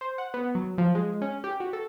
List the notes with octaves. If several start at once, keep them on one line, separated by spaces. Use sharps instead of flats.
C5
F#5
B3
F#3
F3
G#3
C#4
G4
F#4
A4